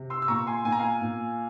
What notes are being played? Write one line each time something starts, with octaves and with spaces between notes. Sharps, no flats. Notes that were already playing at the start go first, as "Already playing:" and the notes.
Already playing: C3
C6 E6
E6
A#2 A#5 C#6
G#5 C6
A#2 G#5
A#5
F5 G#5
A#2